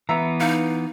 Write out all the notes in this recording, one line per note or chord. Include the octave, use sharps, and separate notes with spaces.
E3 B3 E5 A#5
D#4 F5